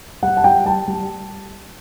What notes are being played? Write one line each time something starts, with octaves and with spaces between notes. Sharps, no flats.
G3 F#5
A5
G3 G5
G3 A5
G3